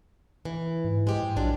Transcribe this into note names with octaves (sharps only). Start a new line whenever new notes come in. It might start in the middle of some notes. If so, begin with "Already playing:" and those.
E3
G#2
G#3 G4 C5
G#2
A#1 F#3 D4 F4